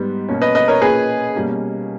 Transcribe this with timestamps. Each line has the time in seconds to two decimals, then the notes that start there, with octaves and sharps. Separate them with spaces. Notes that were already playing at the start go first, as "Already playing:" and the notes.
Already playing: G#2 G3 B3
0.29 B2 A#3 C#4
0.42 B4 D#5
0.55 B4 D#5
0.68 A#4 C#5
0.81 A#2 A#3 C#4 G#4 B4
1.35 B2 G3 A#3 C#4